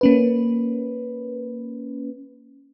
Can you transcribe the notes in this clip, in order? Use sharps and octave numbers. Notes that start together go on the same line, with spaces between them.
A#3 C#4 B4